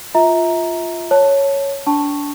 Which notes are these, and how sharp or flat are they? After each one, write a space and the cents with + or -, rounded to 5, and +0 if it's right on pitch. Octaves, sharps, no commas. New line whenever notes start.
F4 +0 E5 -30 A#5 +0
C#5 +0 A5 +0
D4 -25 A5 +0 C#6 +0